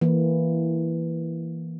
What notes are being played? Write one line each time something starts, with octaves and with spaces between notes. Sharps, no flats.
E3 A#3